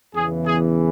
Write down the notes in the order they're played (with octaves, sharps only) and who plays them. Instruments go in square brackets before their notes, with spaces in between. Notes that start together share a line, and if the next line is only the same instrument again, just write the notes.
[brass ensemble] E2 C#3 E3 G#4
G#4